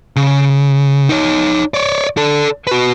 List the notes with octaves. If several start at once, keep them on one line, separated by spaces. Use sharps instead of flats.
C#3
D#4 C#5
C#5 D5
A4 D5
F#4 B4